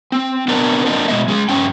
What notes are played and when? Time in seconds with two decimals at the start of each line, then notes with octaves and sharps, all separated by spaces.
0.12 C4
0.48 B3 C4 D4 A#4 B4
0.85 A#3 C4 D4 F4 A#4 D#5
1.08 B2 G#3 F4 D#5 E5
1.28 G#3 C#4 G#4
1.49 G2 C#4 G5